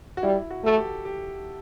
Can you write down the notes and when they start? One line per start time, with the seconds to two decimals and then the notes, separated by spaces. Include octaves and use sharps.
0.17 F#4
0.23 G3 E4
0.51 F#4
0.64 A3 A4
0.77 G4
1.05 G4